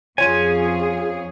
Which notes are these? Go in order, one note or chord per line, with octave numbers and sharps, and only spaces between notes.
F2 C#4 F4 G#4 C#5 G#5 D#7